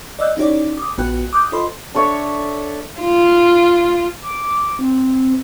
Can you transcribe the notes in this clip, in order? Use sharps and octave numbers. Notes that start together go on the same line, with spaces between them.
D5 D#5 E6 F#6 G6
C#4 D#4 E4 G4 C#5 D5
D6 D#6
A#1 B3 F#4 B4 G5 F#6
D6 D#6 F#6 G6
F4 A4 C5 D#5 B5 C6
D4 A4 C#5 E5
F4
D6
C4